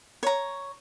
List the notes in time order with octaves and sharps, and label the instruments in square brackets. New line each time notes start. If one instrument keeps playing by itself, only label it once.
[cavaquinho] C#5 A#5